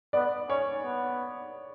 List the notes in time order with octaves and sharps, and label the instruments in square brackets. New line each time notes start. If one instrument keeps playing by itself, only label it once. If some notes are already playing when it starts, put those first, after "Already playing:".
[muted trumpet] B3 [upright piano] D5
[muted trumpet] C#4 [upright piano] C#5
[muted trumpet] B3